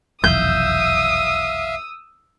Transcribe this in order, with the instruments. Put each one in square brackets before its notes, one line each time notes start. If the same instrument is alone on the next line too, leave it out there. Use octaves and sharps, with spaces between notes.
[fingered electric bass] F1 B1 E2 [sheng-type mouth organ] E5 F5 [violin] D#6 E6 [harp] G6